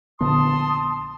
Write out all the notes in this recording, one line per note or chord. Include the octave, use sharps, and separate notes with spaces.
A#1 D3 B3 A5 C6 D#6